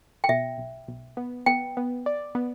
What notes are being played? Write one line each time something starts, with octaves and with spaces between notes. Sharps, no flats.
G5
B2 E5
B1
B1
B3
B3 G5
B3
D5
B3